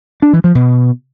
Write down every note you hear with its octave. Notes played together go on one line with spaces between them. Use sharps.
D4
E3
F3
B2